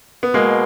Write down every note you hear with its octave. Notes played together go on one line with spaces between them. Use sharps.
B3
B2 G#3 A#3